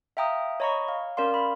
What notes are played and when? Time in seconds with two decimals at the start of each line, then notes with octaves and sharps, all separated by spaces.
0.17 E5 F5 G5 A#5 D#6
0.60 C#5 D#5 A#5 B5 C#6
0.88 F5
1.17 C#4 A#4 D5 F5 C6
1.34 B5